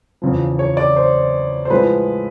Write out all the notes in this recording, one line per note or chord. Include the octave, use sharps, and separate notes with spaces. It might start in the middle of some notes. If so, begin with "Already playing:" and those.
E2 C#3 F3
C#5
D5
C5
C5
A2 F3 G#3 B4